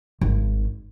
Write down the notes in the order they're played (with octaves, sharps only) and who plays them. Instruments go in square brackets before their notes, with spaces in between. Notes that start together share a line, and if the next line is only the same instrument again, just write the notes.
[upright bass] G#1